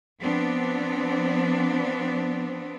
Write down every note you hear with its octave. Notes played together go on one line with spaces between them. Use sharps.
F3 B3 C4 D4